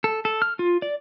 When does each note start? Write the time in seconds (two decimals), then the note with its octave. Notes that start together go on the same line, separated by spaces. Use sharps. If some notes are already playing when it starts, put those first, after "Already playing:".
0.04 A4
0.25 A4
0.42 F6
0.59 F4
0.82 D5